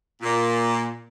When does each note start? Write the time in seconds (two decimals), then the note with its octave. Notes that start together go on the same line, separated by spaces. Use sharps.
0.22 A#2